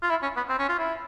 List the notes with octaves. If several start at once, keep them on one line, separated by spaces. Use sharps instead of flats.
F4
E4
C#4
B3
C4
C#4
F4
E4